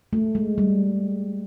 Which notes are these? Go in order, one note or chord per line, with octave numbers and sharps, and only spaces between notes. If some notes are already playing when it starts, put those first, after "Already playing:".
A3
G#3
G3